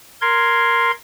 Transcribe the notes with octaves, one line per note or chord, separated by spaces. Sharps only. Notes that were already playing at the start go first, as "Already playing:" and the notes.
A#4 C6 G#6